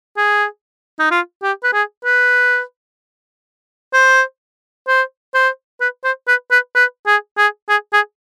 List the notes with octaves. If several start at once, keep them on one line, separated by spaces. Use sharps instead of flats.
G#4
D#4
F4
G4
B4
G#4
B4
C5
C5
C5
B4
C5
B4
B4
B4
G#4
G#4
G#4
G#4